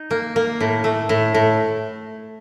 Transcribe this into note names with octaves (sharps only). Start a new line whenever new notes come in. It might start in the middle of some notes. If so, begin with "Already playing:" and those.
Already playing: D#4
A#3
A#3
A2
A3
A2
A2